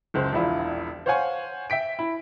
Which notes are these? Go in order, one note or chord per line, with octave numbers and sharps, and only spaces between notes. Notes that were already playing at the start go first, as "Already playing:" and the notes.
F#1 C#2 C5
E1 A#1 E4 F4
C5 C#5 F5 F#5 G#5 C#6
E5 G5 B6 D7
E4